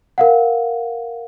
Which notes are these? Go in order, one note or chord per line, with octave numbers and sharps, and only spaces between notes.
A#4 F5 F#5